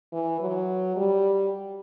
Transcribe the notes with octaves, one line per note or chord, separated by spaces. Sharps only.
E3
F#3
G3